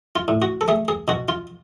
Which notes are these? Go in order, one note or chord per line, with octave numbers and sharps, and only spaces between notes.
F4
A2
F#4
A4
A3 G#4
G#4
B2 F#4
F4